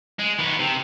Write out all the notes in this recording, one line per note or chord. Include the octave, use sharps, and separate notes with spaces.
G#3
D#3 B3
C3